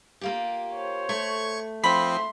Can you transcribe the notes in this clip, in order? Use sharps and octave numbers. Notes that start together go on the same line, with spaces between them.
A#3 F4 G4
C5 C#5
A3 C#6 G#6
F3 C4 E5 B5 C6